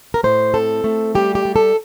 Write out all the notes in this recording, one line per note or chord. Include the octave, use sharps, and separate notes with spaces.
A#4
A2 C5
C4 A4
A3
G3 G4
G4
G3
A4